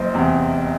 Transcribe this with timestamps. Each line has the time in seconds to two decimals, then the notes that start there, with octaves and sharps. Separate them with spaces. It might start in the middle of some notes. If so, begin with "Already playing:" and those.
Already playing: F#1 C5 D#5
0.14 E2 C3